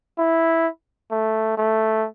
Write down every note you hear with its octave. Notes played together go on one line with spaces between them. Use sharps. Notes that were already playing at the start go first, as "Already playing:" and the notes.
E4
A3
A3